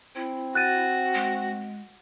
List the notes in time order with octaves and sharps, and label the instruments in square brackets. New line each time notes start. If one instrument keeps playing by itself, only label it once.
[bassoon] C4 [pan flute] E4
[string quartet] F#4 [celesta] F#6 A6 D#7
[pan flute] G#3